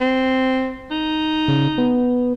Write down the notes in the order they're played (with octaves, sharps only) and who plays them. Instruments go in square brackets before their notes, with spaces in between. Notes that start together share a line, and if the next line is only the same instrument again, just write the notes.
[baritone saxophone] C4
D#4
[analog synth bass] C#3
B3